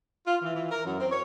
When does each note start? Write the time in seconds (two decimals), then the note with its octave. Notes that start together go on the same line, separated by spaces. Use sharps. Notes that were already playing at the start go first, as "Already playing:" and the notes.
0.25 F4
0.39 E3
0.53 E3
0.69 A#4
0.84 F#2
0.98 C4
1.10 C#5